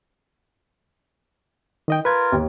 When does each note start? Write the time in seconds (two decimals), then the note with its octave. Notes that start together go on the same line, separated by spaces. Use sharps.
1.88 D#3 D#5 G5
2.05 F4 A#4 B4 G#6
2.32 D#2